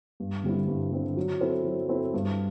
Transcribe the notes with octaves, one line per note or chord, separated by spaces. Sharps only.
G2
D3 G3 C4 E4
G2
D3 G3 C4 E4
F#3
C4 E4 A4 C5
F#3
C4 E4 A4 C5
G2